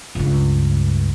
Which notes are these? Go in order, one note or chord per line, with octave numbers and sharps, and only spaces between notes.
C#2 G2